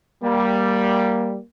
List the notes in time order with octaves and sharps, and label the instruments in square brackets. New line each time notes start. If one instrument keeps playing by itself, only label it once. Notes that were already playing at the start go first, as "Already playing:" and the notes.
[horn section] G3 [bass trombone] A#3